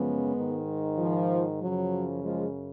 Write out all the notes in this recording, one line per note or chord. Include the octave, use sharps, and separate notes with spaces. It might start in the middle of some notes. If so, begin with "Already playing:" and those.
Already playing: F#2 C#3 F3 G#3 B3
G#2 D#3
F3
F#2 C#3 F3 F#3
F3 G#3